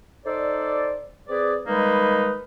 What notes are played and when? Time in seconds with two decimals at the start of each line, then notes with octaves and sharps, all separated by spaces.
0.24 D#4 A4 C5 D5
1.28 C4 G#4 B4 D5
1.67 D#3 G3 G#3 A#3 D#4 B4